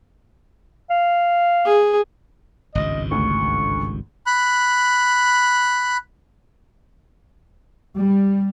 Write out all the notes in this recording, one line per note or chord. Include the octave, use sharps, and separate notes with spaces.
F5
G#4
G#1 C#2 G2 D#5
D2 C#6
B5 F#6
G3